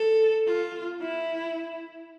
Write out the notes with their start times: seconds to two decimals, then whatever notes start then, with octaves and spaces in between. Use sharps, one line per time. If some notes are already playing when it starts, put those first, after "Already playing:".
Already playing: A4
0.47 F4
1.01 E4